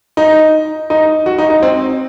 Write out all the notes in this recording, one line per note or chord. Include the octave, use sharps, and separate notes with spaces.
D#4
D#4
F#4
D#4
D#4
C4